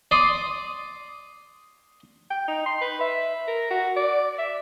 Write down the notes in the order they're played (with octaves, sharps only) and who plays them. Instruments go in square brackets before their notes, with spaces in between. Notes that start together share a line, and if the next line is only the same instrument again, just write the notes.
[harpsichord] D5 C6 D#6
[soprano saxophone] G5
D#4
C6
B4
E5
A#4
F#4
D5
E5